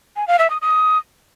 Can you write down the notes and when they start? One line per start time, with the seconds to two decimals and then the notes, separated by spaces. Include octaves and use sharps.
0.16 G#5
0.27 F5
0.39 E5
0.50 D#6
0.61 D#6